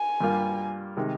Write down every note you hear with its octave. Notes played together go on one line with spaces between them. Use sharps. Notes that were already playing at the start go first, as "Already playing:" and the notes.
Already playing: G#5
G2 G3 A#3 F4
C3 D#3 G#3 D#4